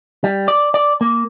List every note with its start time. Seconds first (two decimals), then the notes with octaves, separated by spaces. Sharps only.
0.24 G3
0.48 D5
0.74 D5
1.01 A#3